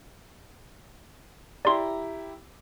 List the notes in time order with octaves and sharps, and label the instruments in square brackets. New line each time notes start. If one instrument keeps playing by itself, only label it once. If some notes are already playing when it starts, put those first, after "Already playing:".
[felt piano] E4 G4 A#5 [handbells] D5 C6